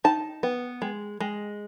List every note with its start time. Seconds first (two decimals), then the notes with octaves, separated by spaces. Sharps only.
0.04 D#4 A5
0.43 B3
0.82 G#3
1.20 G#3